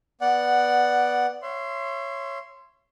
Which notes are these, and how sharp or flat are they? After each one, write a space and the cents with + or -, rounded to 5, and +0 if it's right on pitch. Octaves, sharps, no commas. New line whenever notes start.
B3 -10 D5 +0 F#5 +0
C#5 -10 E5 +35 C6 -5